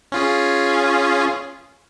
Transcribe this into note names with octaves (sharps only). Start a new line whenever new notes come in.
C#4 F4 G#4